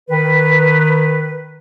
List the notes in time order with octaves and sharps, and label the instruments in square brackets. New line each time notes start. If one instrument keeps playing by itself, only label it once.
[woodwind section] D#3 B4